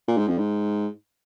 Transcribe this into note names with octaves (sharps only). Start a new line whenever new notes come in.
A#2
G#2
F2
G#2